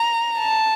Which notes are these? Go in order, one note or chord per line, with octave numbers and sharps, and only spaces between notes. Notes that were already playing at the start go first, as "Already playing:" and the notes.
Already playing: A#5
A5